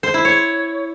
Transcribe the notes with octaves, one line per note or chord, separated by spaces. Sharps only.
C5
E4
C#5